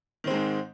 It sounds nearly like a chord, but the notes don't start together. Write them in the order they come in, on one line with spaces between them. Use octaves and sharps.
D#3 C4 G#3 G#2